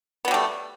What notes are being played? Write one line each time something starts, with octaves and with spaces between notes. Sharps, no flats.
F#3 G3 A3 B3